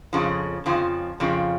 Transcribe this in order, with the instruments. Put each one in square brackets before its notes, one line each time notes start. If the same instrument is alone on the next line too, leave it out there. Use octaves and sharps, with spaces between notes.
[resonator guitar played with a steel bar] F2 C#3 F3
F2 C#3 F3
F2 C#3 F3